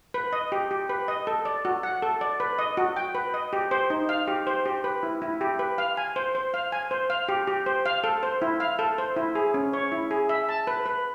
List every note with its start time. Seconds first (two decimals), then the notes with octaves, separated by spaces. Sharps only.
0.14 B4
0.33 D#5
0.52 G4
0.71 G4
0.89 B4
1.08 D#5
1.27 A4
1.45 D5
1.65 F#4
1.83 F#5
2.02 A4
2.21 D5
2.40 B4
2.59 D#5
2.77 F#4
2.97 G5
3.15 B4
3.34 D#5
3.53 G4
3.71 C5
3.90 D#4
4.09 F5
4.28 G4
4.47 C5
4.66 G4
4.84 B4
5.03 E4
5.22 E4
5.41 G4
5.59 B4
5.78 F5
5.97 G#5
6.16 C5
6.35 C5
6.54 F5
6.72 G#5
6.91 C5
7.10 F5
7.29 G4
7.47 G4
7.66 C5
7.86 F5
8.04 A4
8.23 C5
8.42 E4
8.60 F5
8.79 A4
8.98 C5
9.17 E4
9.35 G#4
9.54 C#4
9.73 C#5
9.92 E4
10.11 G#4
10.29 E5
10.49 A5
10.67 B4
10.86 B4